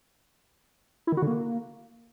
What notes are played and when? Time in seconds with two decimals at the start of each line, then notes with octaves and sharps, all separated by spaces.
1.07 E4
1.12 D#3
1.17 F#4
1.22 D3
1.27 A#3